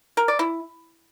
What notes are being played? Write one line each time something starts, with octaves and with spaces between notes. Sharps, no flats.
A#4
D5
E4